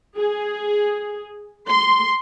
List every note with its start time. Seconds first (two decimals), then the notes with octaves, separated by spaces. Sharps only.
0.17 G#4
1.67 C6